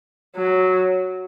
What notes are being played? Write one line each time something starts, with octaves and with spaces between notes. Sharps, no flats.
F#3